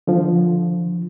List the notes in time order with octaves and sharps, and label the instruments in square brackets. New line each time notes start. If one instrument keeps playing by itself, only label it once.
[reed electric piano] D3 F3